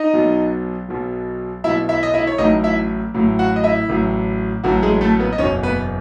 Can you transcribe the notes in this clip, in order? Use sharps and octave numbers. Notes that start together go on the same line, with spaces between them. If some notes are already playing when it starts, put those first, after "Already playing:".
Already playing: D#4 D#5
B1 B2 F#3
B1 B2 F#3
B1 B2 F#3 E4 E5
E4 E5
D#5
E4 E5
C#5
A1 A2 F#3 D#4 D#5
E4 E5
A1 A2 F#3
F#4 F#5
D#5
E4 E5
A1 A2 F#3
A1 A2 F#3 F#4
G#3 G#4
A3 A4
B3 B4
D#5
F#1 E2 B2 F#3 C#4 C#5
B3 B4